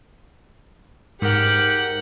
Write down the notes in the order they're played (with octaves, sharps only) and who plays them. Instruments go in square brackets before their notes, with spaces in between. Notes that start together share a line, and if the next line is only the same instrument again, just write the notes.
[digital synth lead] G#2 [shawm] G4 [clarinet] A#4 [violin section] F#5 F#6